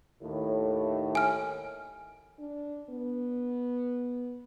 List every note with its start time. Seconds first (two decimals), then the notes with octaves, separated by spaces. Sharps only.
0.22 D#2 A2
1.15 G#5 F6
2.39 D4
2.89 B3